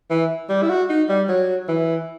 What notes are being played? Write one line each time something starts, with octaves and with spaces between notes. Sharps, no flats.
E3
G3
E4
F#4
D#4
G3
F#3
E3